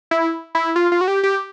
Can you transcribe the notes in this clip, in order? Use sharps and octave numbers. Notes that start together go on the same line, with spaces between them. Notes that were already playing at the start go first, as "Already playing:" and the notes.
E4
E4
F4
F4
F#4
G4
G4